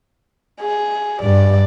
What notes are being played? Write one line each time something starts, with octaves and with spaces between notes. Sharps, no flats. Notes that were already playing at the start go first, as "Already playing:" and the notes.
G#4
G2 D5